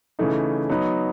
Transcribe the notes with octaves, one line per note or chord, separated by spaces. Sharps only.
C#3 E3 A3 D#4
F#3 B3 D#4